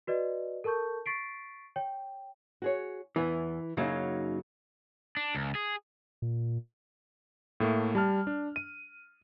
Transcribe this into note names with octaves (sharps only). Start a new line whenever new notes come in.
F#4 B4 D5 D#5
A4 A#4 A5 C#6 G6
C#6 A6 B6 C7 D7
C#5 G5
F#4 G#4 C#5
E2 E3 B3 G#5
F#2 C#3 F#3 A#3 D#4
D4
C#2
G#4
A#2
A2 A3 A#3
G3 A5 F6
D4
D#7